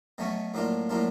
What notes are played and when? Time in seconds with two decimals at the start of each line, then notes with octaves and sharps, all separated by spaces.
0.18 B2 F#3 A3 C#4
0.54 A2 F#3 A#3 D4 F4
0.89 A2 F#3 A#3 D4 F4